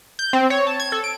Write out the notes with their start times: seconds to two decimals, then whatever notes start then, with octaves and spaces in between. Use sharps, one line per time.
0.19 G6
0.33 C4
0.50 C#5
0.67 A5
0.80 G#6
0.92 A4
1.04 D7